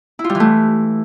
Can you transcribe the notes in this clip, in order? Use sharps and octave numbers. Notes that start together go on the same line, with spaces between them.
E4
F4
G3
E3
A3